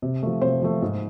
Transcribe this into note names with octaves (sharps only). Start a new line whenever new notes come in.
C3
F3 A3
C3 C5
F3 A3
G#2